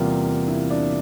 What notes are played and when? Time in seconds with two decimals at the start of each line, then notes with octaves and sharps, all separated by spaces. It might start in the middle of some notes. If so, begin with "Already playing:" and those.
Already playing: E2 C3 G3 A#3 F4
0.48 E4
0.70 D4